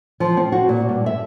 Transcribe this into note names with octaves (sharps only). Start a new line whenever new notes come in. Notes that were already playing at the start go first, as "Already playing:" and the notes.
F3
C4
F#4
A#2
G2
E5